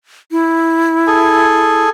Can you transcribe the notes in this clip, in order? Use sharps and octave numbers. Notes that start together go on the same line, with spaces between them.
E4
G#4 A4 G#5